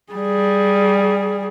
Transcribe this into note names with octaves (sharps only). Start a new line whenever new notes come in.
G3 G#4